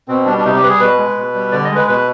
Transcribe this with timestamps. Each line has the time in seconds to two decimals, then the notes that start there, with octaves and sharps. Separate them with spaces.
0.08 B2 C4
0.26 G3 D4
0.38 D4
0.44 C3 D#4
0.56 G4
0.62 G3 B4
0.68 G#4
0.80 B2 B4
0.98 G#3
1.16 B2
1.34 G3
1.52 D3 D5
1.64 D#5
1.70 G#3
1.75 B4
1.88 B2 B4